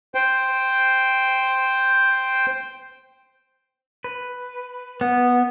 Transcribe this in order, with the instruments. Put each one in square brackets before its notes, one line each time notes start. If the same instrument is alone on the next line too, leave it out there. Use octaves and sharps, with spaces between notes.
[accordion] C5 G5
[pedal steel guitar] B4
B3